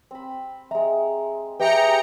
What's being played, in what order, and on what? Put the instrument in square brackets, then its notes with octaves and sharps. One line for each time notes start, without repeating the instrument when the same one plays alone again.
[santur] C4 B5
[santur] G#3 A#5 [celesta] E5
[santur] G4 G#4 D#6 [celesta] B4 E5 [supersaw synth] G5 A#5 C#7